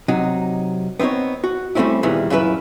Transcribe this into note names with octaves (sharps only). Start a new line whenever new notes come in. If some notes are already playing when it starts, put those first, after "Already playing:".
C3 F#3 D#4
B3 C4 D4 D#4 C#5
F#4
G3 A3 A#3 C4 C#4 E4
E2 A#2 D#3 E3 G3
F#2 A#2 C#4 E4 G4 B4